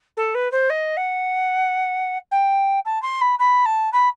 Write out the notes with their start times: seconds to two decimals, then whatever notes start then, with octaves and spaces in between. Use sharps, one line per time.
0.16 A4
0.34 B4
0.51 C5
0.69 D#5
0.96 F#5
2.31 G5
2.85 A5
3.02 C6
3.21 B5
3.39 B5
3.65 A5
3.92 B5